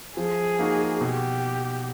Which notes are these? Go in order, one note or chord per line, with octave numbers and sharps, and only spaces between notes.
F3 G#4
A#3 D#4 F#4
B2 G4